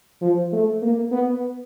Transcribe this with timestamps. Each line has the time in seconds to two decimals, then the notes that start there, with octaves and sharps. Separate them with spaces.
0.22 F3
0.53 A3
0.82 A#3
1.12 B3